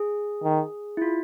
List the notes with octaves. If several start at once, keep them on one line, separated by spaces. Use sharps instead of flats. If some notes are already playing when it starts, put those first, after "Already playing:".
Already playing: G#4
D#3
E4
F4